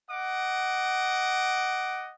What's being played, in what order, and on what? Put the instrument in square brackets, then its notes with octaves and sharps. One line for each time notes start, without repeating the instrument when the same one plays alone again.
[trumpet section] D#5 F#5 D6